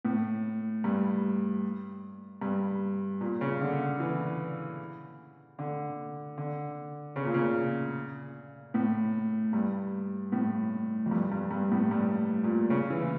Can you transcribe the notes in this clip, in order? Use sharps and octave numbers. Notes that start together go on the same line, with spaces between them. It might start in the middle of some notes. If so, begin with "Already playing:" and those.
A2
G2
G2
A#2
C#3
D3
E3
D3
D3
C#3
A#2
C#3
A2
G2
A2
F2
G2
G2
G2
A2
G2
A#2
C#3
E3